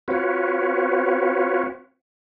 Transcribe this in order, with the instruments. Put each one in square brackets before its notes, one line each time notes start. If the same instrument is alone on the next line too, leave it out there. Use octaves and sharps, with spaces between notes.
[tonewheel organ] C4 F4 F#4 B4 C#5